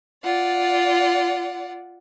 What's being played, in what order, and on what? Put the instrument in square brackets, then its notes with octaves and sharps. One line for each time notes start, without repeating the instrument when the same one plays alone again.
[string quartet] F4 D5 F#5